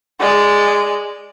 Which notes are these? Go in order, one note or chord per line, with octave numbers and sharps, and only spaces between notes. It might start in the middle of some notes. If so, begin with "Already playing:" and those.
G#3 D5